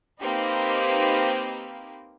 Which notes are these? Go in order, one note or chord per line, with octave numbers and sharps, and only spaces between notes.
A#3 C4 D#4 G4 B4